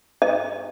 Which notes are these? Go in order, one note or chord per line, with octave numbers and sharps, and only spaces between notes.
D#5